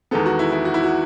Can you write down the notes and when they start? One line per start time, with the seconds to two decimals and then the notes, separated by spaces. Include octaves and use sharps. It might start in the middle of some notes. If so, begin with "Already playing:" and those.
0.11 E2 D#3 G#3 B3 A4
0.26 F#4
0.39 E4
0.52 E4
0.65 F#4
0.74 E4
0.83 F#4